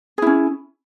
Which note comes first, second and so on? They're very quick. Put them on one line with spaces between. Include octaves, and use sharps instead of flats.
G#4 E4 C#4